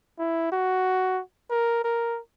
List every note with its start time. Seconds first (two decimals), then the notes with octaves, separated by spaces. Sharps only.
0.19 E4
0.52 F#4
1.51 A#4
1.84 A#4